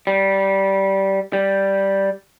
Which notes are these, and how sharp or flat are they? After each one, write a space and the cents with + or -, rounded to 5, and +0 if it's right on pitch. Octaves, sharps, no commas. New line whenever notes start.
G3 -15
G3 -5